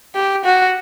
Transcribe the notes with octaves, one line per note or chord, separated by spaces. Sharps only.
G4
F#4